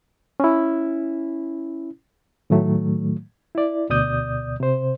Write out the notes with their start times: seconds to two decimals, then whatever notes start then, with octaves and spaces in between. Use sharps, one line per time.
0.40 C#4 E4
2.50 A2 D#3 F#3 A3
3.55 E4 D5
3.90 D2 B2 D5 D#6 G6
4.60 C3 C5